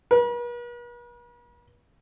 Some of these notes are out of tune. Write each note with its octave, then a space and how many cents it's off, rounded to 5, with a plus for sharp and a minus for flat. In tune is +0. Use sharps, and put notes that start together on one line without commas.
B4 -45